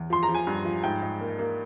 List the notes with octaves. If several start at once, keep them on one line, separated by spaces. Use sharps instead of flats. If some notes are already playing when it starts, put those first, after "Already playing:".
Already playing: E2
F3 C6
A#5
F3
G#5
G2
F3
G#2 G5
G#2
A#3
A#3